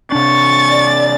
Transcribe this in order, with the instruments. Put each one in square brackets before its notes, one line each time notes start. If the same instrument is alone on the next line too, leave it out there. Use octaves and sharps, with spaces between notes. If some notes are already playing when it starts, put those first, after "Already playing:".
[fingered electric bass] C3 D4 [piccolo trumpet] C#6 [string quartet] A6
[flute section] D5